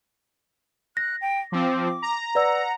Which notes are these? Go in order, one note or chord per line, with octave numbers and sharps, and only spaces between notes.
F#6 A#6
G5
F3 C4 D6
A#5
B4 D5 F#5 E6